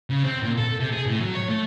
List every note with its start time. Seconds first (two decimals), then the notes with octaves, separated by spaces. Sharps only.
0.10 C#3
0.24 C4
0.43 A#2
0.58 A4
0.80 C3
0.92 G#4
1.06 A2
1.21 F#3
1.35 C#5
1.49 A3